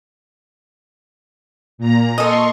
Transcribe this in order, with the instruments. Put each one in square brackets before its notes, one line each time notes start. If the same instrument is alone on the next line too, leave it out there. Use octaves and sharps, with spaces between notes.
[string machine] A#2 A#5
[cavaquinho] A4 D#5 [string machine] C6 C#6